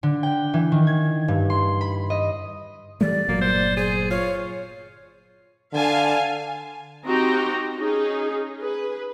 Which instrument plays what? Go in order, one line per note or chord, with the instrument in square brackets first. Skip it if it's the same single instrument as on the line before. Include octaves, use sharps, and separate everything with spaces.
[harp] D3
G5
E3
D#3
G#6
G2
C6
B5
D#5
[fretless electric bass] E3 G3 A3 [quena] D5
[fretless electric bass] G1 A#2 F#3 [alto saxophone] A#3
[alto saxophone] C5
[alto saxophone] G#4 [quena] C5
[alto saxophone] F4 [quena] C#5
[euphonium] D3 [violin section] F5 G#5 A5
[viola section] C4 D#4 F#4 G4 G5 A#5
C#4 D#4 G#4
G#4 B4